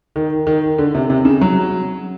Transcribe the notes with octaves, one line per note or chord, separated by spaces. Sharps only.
D#3
D#3
D3
C3
C3
C#3
F#3